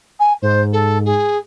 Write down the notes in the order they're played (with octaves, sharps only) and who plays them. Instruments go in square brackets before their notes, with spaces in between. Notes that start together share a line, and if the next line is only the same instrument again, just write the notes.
[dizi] G#5
[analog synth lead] G#2 [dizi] C5
[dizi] A4
G#4